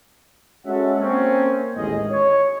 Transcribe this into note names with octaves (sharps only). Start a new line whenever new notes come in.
G#3 C#4 F#4 A4 E5 F#5
A#3 C4 C#4
A1 D#2 G#3 G#4 D#5
C#5